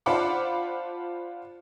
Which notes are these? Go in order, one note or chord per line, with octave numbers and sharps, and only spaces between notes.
D4 F4 C5 F#5 B5 D6